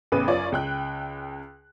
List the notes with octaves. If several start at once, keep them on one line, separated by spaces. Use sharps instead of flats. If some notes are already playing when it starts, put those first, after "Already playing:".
A1 E2 C#3 B4 D#7
F#2 F4 C#5 D5
C#2 G5 F#6